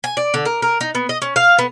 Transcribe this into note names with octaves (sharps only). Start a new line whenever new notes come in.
G#5
D5
D3
A#4
A#4
D#4
B3
D#5
C#4
F5
B3